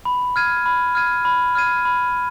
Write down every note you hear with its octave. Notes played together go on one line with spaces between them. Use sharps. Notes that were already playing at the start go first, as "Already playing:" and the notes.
B5
F6 G#6 D#7
B5
F6 G#6 D#7
B5
F6 G#6 D#7
B5